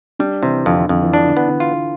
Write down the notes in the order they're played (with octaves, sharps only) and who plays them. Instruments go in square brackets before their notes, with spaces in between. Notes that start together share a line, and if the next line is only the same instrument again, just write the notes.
[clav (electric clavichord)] G3 [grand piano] D4
[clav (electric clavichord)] C3 [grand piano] E3
[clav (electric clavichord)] F2 [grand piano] D3
[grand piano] E3
[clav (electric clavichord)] F2 [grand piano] D3
[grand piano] E3
[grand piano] E3 [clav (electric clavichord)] D4
[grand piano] D3
[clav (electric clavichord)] B3
[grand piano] D3
[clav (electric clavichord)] F4